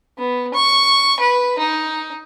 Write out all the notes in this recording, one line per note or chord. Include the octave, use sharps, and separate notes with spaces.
B3
C#6
B4
D#4